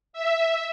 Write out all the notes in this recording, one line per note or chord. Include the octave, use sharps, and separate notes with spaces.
E5